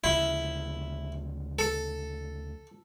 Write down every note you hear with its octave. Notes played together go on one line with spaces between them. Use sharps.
D2 C#3 F3 E4
A4